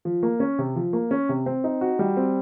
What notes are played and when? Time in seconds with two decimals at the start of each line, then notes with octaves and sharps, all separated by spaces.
0.05 F3
0.23 A#3
0.40 C#4
0.59 C3
0.76 F3
0.93 A#3
1.11 C#4
1.29 C3
1.46 C4
1.64 D#4
1.81 F#4
1.99 G3
2.17 C4